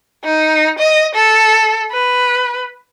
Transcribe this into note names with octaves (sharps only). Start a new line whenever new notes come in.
D#4
D#5
A4
B4